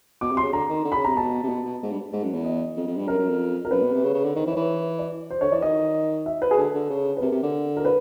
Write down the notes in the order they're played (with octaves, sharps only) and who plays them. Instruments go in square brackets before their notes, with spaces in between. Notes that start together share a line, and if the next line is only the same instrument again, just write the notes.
[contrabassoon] B2 [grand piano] D6
[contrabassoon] C3
[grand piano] C6
[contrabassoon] C#3
[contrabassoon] D3 [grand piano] A#5
[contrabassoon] D#3
D3
[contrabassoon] C#3 [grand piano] B5
[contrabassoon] C3 [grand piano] A#5
[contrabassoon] B2 [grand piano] A5
[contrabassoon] C3
B2
B2
G#2
G2
G#2
F#2
E2
[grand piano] D#5
[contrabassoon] F2
F2
G2
[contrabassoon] F#2 [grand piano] A#4
[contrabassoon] F#2
F2
[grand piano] A#4
[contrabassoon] F#2 [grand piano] B4
[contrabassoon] B2
C3
C#3
C#3
D3
[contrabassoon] D#3 [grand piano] C5
[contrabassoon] E3
[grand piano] C#5
[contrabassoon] E3
[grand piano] D5
C5
[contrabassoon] D3 [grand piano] C#5
[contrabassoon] E3 [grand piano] D5
[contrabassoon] D#3 [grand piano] D#5
[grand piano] E5
B4
G#4
[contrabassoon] D3 [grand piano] A4
[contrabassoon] D3
C#3
[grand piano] B4
[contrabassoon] C3 [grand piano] A#4
[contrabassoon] C3
D3
[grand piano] A#4
B4